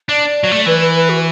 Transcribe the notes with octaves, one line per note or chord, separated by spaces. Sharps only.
D4 D5
F#3
A3
E3 B4
B4
B4
F#4